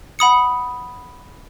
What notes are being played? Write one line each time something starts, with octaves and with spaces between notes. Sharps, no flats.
F#5 B5 D#6 C#7